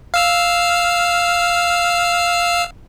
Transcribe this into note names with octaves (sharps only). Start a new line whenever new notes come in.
F5 E6 F6